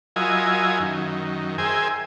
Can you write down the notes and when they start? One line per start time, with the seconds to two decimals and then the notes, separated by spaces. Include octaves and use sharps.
0.16 F#3 E4 F4 A#4 D#5 G#5
0.80 F#2 D#3
1.58 G#4 A#4 C5 E5 G5 G#5